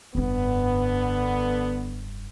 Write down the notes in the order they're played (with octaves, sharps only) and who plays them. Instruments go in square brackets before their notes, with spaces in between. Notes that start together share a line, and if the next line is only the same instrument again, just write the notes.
[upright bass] F1 G2 [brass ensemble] D3 B3